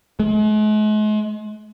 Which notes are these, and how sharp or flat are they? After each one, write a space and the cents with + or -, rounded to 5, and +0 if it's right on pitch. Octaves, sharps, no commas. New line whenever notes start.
G#3 +45